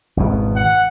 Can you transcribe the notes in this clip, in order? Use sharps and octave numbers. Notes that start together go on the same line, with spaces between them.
G#1 E2 B2
F#5